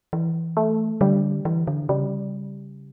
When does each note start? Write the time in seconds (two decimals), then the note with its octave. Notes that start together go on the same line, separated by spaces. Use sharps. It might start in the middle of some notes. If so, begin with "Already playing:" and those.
0.13 E3
0.57 A3
1.01 D3 G3
1.45 E3
1.67 D3
1.89 C#3 G3